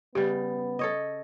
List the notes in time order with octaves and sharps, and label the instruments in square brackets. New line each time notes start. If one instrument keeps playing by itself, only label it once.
[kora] C#3 G3 [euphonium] B3 [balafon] G4
[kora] A4 C#5 D#5